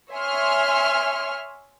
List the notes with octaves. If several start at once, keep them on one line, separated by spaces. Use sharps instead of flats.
C#5 E5 G#5 C6 F6